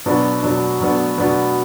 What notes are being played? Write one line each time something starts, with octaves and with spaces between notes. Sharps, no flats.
B2 F#3 B3 D4
B2 F#3 B3 D4
B2 F#3 B3 D4
B2 F#3 B3 D4